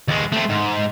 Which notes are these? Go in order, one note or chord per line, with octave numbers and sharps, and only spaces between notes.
D#2 G#3
A3 C4
G#2